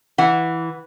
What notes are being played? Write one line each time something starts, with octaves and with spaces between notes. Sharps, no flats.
E3 F#5